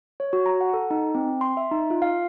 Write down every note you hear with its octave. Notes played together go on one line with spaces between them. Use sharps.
C#5
F#4
A#5
F#5
A4
D#4
C4
C6
E5
D#4
F4
F5